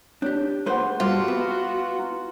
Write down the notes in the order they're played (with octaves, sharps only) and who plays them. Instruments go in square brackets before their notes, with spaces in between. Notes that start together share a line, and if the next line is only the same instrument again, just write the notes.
[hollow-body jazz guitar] D4 G4 [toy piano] C#5
[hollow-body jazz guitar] A3 B4 C5 [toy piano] F4 G#4 F#5
[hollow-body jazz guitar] G2 [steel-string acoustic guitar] F4 [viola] F#4 [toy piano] E5 D6
[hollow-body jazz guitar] B3
[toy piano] E4